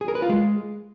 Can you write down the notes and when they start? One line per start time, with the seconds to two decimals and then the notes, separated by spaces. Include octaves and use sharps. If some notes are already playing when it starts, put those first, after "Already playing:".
0.01 G#4
0.08 A#4
0.15 B4
0.22 F4
0.29 G#3